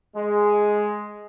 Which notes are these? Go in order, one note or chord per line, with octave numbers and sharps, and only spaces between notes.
G#3